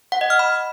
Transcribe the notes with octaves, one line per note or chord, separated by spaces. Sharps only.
F#5
D#5
F6
B5